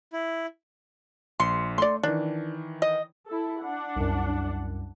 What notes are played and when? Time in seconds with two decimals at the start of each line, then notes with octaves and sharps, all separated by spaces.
0.13 E4
1.40 A#1 C6 C#7
1.78 A3 D5 C6
2.03 D#3 E3 D4
2.82 D#5
3.28 E4 A4
3.64 D4 F#5
3.96 C2 F#2